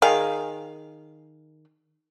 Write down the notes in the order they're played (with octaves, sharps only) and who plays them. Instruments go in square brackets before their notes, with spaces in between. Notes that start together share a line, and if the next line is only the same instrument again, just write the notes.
[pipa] D#3 G#4 F5